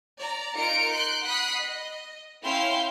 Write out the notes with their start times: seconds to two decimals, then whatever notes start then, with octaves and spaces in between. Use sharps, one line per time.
0.18 D5 A#5
0.57 D#4 F4 A#4 C#7 D7
0.92 C6 F#6 G6 D7
1.24 F#5 B5 D#6 F#6 B6 C7
1.59 D#5
2.43 C#4 E4 F5 G5 C6